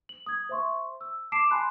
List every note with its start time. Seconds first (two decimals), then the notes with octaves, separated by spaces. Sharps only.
0.09 F#7
0.26 D#6 G#6
0.49 C5 E5 C6 C#6
1.01 E6
1.32 A5 D6 C7 D7 E7
1.51 G#5 A5 B5 C6 F#6